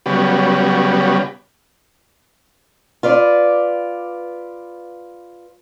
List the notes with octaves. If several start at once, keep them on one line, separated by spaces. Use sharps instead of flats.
C#3 F#3 G3 B3
F4 B4 D5